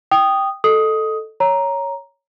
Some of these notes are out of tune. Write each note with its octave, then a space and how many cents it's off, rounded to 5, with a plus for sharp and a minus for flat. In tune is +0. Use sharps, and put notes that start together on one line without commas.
G5 +0 D#6 -10
A4 +0 D#5 -10 D#6 +10
C#5 +0 A#5 +5